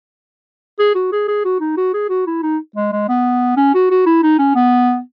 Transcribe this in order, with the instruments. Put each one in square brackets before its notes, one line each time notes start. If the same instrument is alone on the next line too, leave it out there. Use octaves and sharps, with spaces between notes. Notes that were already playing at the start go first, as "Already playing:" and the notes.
[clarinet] G#4
F#4
G#4
G#4
F#4
D#4
F#4
G#4
F#4
E4
D#4
G#3
G#3
B3
C#4
F#4
F#4
E4
D#4
C#4
B3